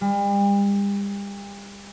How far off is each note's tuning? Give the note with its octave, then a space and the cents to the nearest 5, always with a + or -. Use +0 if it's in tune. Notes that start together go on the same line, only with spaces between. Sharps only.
G3 +40